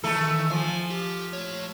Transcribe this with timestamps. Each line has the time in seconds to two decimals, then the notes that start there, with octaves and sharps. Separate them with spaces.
0.04 D#3 E3 A3 A4
0.51 F3 G#5
0.90 G4
1.33 A3 C#5